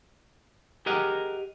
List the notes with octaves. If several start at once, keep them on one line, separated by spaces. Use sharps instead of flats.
G4 G#4 A#4 D#5 F#5